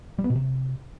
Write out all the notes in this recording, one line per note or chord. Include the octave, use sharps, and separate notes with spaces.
G3
B3
B2
C3